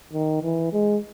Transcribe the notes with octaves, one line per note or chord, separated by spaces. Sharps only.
D#3
E3
G#3